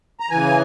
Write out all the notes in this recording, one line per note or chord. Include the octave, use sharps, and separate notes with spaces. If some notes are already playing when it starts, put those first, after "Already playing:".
A#5
C#3 E3 G#5